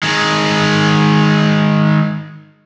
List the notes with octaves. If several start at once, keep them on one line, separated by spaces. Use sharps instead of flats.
D#3 G#3